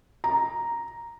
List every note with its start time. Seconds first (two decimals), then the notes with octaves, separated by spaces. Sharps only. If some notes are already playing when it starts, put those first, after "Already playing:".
0.24 A#5